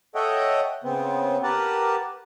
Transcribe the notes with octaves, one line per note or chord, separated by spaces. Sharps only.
A4 C#5 D#5 E5 F#5 G5
C#3 B3 C4
G4 A#4 B4 F#5 A5